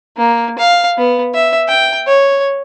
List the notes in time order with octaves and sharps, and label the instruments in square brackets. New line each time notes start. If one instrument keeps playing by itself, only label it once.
[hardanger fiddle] A#3
F5
B3
E5
G5
C#5